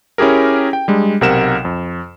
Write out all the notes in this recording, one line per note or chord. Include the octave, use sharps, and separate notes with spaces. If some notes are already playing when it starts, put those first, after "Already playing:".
C#4 E4 G4 G#4 A#4
G5
G3 G#3 D4
B1 C3 A#4 F#5 E7
F2